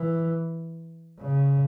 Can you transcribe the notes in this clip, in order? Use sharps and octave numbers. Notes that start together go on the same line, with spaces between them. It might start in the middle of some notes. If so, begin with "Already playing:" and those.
Already playing: E3
C#3